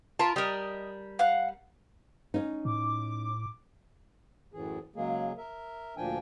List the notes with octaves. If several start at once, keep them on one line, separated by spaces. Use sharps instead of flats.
F4 A#4 A5 B5
G3 A#4 D#5
F5 F#5 F#6
C#4 D#4
A2 D6
F#2 A2 E3 G#4
C#3 F#3 G#3 A#3 G#4
A#4 E5
D2 A#2 F3 D4 G5 G#5